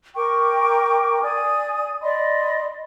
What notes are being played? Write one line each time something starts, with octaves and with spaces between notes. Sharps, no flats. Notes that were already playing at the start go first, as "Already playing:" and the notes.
A#4 G5 C#6 D6
D5 G#5 D#6
D5 D#5 B5 C6